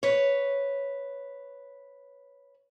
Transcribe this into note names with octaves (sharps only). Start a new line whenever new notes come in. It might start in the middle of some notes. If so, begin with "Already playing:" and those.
B4 C#5